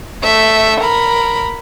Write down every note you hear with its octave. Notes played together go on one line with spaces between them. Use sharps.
A3 E5
A#4 B5